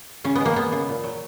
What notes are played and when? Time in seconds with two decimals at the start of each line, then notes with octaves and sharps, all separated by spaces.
0.24 C#3 C#4
0.35 B3
0.40 G#3 A#3
0.56 G#3 B3
0.72 C#3 B3
0.89 A#2
1.04 F#3